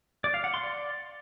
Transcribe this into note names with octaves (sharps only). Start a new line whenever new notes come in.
D5
F5
F#5
C6
D5